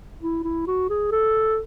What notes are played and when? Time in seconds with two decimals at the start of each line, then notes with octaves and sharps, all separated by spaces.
0.22 E4
0.44 E4
0.67 F#4
0.89 G#4
1.12 A4